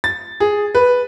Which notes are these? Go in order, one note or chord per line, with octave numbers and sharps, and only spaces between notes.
A6
G#4
B4